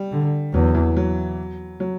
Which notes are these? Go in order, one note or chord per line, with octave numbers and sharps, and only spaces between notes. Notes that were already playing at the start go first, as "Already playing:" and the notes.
Already playing: G3
D3
E2 F#3
E3
F#3
F#3